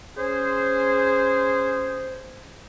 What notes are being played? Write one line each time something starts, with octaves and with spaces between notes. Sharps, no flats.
C#4 G#4 C5